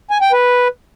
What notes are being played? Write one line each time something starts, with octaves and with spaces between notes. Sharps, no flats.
G#5
G5
B4